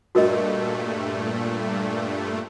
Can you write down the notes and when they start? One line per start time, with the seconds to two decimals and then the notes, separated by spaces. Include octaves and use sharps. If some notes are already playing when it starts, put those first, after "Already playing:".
0.15 G2 A#2 A3 F#4 A#4 D#5